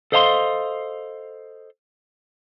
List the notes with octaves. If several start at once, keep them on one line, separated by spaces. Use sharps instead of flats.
A4 C5 D#5 F5 A5 C6